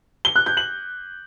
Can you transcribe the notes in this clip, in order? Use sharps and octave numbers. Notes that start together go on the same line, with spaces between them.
G7
F#6
G6
F#7